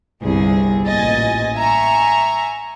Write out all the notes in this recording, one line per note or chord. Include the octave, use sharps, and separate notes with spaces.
G1 C2 G#4
A1 A#2 D#5 G#5 A6
E5 G#5 A#5 C#6